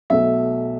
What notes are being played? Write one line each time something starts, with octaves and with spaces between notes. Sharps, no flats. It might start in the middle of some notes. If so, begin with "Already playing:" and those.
B1 B2 A3 E5